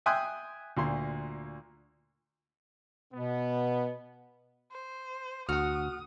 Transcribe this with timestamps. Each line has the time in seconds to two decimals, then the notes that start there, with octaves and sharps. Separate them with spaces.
0.06 E5 G5 G#5 C6 D#6 F#6
0.77 D2 A#2 C6
3.14 B2 B3
4.72 C5
5.49 D2 F#4 F#5 D#6 F6